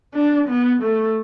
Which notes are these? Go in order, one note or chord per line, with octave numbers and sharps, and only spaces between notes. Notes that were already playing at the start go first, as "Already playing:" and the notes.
D4
B3
A3